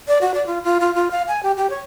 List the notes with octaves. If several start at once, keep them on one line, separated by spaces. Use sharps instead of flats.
D5
F#4
D5
F4
F4
F4
F4
F5
G#5
G4
G4
C#5